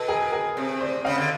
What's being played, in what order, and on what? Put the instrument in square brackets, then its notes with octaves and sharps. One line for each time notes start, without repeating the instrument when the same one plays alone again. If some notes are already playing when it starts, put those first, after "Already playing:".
Already playing: [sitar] B2 [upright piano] A4 B4
[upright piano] G#4 A#4
G#4 A#4
[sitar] C3
[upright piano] C5 D5
[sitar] C#3 [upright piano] D#5 F5
[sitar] D3